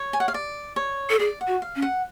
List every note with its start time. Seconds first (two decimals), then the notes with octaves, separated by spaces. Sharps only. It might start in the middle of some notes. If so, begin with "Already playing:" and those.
Already playing: C#5
0.13 G#5
0.20 F#5
0.28 F5
0.34 D5
0.76 C#5
1.10 A4
1.19 G#4 D5
1.41 F#5
1.47 F#4
1.62 F5
1.76 C#4
1.82 F#5